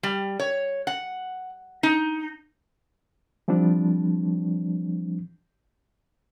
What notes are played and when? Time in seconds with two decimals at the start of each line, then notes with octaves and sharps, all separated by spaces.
0.03 G3
0.40 C#5
0.87 F#5
1.83 D#4
3.48 E3 F3 G3 C4 D4